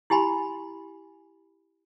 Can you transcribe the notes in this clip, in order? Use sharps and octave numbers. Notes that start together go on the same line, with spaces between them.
E4 G4 G#5 B5 C6